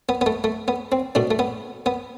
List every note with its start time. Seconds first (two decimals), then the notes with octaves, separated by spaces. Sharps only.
0.09 B3
0.21 B3
0.26 A3
0.44 A3
0.68 B3
0.92 C4
1.15 B2 A3 D4
1.31 A3
1.39 B3
1.86 B3